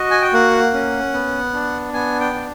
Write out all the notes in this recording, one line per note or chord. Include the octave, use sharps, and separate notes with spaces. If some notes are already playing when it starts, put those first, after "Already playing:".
Already playing: F#4 D#5
G#5
G5
A#3 F#5
C#4
B3
D4
B3 G#5
G5
D4